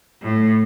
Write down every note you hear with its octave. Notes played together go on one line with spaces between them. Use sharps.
A2